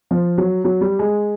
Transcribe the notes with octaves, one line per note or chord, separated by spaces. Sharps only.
F3
F#3
F#3
G3
G#3